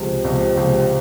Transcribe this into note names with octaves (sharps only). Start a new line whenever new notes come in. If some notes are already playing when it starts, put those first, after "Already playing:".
Already playing: C#2 C3 F3
C#2 C3 F3
C#2 C3 F3